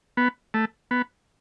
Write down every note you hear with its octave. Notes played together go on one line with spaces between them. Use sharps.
B3
A3
B3